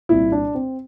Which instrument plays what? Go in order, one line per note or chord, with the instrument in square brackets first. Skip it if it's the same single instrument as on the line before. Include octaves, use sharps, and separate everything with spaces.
[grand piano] C2 A#2 E4
D4
C4